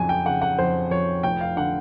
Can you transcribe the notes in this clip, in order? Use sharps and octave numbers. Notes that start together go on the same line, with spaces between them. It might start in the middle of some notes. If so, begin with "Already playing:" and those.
Already playing: F2 C#3 F#3 G#5
G5
C#3 F#5
F#5
F2 C5
F2 C#5
F1 G5
F5
D3 F#5